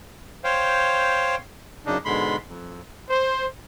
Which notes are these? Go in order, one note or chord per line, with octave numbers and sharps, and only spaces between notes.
C5 C#5 F5 G5
F#2 C#3 D4 D#4
G#2 B2 D3 G#3 B5 C6
F2
C5